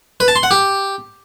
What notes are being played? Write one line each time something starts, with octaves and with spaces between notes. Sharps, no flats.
B4
A5
C6
F#5
G4